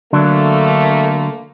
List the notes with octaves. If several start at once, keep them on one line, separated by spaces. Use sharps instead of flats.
D3 F#3 A3 A#3 D4